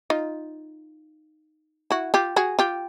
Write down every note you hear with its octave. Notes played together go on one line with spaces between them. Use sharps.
D#4 F4
E4 F#4
F4 G4
F#4 G#4
F4 G4